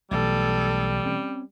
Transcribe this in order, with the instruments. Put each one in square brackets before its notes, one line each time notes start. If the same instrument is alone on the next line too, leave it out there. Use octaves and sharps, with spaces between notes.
[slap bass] B1 [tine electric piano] B2 E3 A3 [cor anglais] G3 [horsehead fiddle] A4
[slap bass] C4 C#4